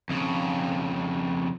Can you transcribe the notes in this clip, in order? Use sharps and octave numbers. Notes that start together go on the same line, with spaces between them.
F2 C#3